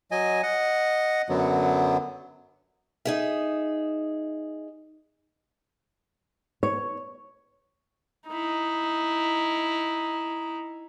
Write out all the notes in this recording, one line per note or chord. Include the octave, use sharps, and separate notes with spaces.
F#3 D#5 G#5
D#5 F#5
F#2 D3 F#3 B3
D#4 G#4 E5
C#5
D#4 E4